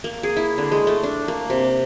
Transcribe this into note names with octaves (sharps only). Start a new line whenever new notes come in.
A#3
G#4
E4
D3
G#3
A3
D4
A#3
C3